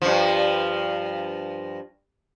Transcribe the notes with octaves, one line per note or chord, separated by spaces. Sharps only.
G2 F3